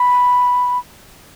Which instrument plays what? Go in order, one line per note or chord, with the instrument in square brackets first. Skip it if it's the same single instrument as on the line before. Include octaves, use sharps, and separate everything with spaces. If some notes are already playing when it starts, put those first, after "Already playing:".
Already playing: [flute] B5